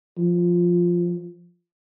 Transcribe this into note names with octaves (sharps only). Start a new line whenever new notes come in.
F3